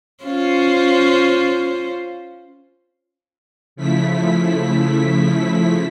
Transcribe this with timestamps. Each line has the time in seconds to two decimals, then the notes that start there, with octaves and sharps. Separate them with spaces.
0.24 C#4 F4 C5
3.76 C#3 F3 A3 E4 B6